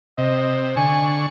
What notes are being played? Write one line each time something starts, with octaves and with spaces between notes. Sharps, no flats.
C3 D#5
D3 G#5 C#6